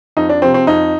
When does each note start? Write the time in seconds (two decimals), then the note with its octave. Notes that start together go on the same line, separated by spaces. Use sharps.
0.17 F2 D#4
0.29 D4
0.42 C3 F3 C4
0.54 C4
0.67 F2 D#4